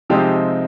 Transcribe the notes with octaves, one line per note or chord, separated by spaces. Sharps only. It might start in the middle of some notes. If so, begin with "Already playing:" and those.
C3 F3 G#3 C4 D#4 G4